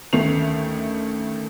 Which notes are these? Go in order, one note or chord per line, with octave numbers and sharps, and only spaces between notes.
D2 D#3 A3 C#4 C7 F7